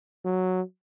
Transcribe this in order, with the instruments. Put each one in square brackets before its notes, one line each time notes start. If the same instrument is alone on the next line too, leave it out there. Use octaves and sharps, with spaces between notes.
[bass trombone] F#3